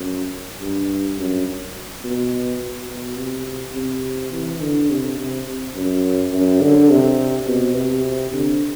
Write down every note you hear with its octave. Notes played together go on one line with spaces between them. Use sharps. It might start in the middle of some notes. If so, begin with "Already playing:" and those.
Already playing: F#2
G2
F#2
B2
B2
C3
C3
E3
D3
C3
C3
F#2
F#2
D3
C3
B2
C3
D3